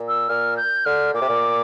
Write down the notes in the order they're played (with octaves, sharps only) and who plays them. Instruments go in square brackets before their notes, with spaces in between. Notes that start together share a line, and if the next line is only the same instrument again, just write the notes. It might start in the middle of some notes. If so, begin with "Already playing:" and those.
Already playing: [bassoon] A#2
[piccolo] E6
[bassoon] A#2 [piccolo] F6
[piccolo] G6
[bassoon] D3 [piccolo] F6
[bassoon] A#2 [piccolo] D6
[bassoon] C3
A#2